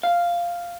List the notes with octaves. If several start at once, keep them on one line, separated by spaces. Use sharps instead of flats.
F5